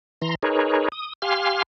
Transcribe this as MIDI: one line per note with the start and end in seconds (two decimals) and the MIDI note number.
0.22 0.35 52
0.22 0.35 82
0.22 0.35 84
0.43 0.88 63
0.43 0.88 68
0.43 0.88 70
0.43 0.88 71
0.43 0.88 73
0.92 1.13 87
1.22 1.63 67
1.22 1.63 77
1.22 1.63 80
1.22 1.63 84
1.22 1.63 89